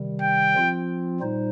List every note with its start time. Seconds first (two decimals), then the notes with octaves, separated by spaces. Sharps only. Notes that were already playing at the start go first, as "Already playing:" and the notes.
Already playing: C3 D#3 G3
0.22 G5
0.55 F3 C4 F4
1.20 A#2 G3 D#4 C5